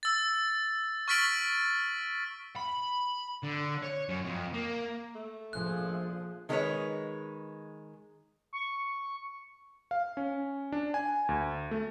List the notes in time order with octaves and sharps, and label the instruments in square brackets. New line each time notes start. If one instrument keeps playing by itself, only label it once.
[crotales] E6 A6
C#6 F6 A6 B6 D7 F#7
[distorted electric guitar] B5
D3
C#5
F#2
F2
A#3
[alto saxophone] A3
[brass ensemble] A#1 A#2 G#4 [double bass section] F3 [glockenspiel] F#6
[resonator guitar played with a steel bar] D#3 G#3 C#4 D#4 B4 C#5
[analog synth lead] C#6
[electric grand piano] F5
C#4
D4
G#5
D2
A3